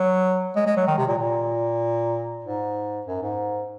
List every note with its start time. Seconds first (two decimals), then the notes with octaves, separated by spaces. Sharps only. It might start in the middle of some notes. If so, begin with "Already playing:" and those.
Already playing: F#3
0.56 G#3
0.66 G#3
0.76 F#3
0.87 D#3
0.98 C3
1.08 A#2
1.18 A#2
2.44 G#2
3.07 F#2
3.22 G#2